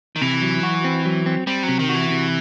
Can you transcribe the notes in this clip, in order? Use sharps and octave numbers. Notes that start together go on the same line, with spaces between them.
D#3
C3 E3
F#3
F#4
C4
F#3
C4
G3 C4
F#3
C3
D#3
F#4
E3
C3